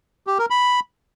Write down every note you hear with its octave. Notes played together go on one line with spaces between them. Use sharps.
G4
A#4
B5